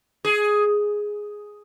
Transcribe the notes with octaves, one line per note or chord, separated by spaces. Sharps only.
G#4